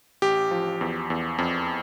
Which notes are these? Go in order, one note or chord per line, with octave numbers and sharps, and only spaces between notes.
A1 G4
F3
E2
E2
F2